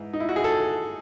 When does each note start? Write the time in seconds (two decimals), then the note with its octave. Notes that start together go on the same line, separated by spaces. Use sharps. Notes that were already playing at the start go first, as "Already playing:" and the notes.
Already playing: G#2 E3
0.13 D#4
0.20 E4
0.29 F#4
0.36 G#4
0.44 A4